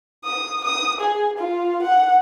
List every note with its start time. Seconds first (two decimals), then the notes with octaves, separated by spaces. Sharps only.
0.25 D#6
0.64 D#6
1.00 G#4
1.38 F4
1.82 F#5